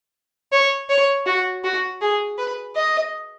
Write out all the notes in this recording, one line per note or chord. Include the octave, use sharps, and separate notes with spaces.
C#5
C#5
F#4
F#4
G#4
B4
D#5